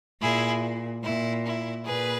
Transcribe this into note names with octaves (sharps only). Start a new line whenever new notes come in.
A#2 E4 G#4
A#2 E4
E4
A#2 G#4 B4